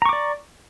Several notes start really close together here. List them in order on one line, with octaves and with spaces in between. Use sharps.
A#5 C#6 D6 D5